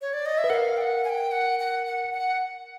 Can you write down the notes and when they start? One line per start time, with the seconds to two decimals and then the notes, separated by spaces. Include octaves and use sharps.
0.01 C#5
0.13 D5
0.26 D#5
0.38 E5
0.44 B4
0.50 A#4 F5 F#5
0.77 G5
0.81 F#5
1.05 G#5
1.09 G5
1.32 F#5
1.59 F#5
1.87 F#5
2.13 F#5